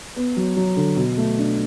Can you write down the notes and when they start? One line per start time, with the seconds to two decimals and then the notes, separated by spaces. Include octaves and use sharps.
0.16 B3
0.37 F#3
0.57 F#3
0.77 D3
0.96 B2
1.18 A3
1.38 D4